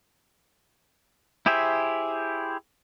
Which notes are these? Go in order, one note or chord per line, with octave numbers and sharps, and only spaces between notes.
E4 G4 G#4 C5 E5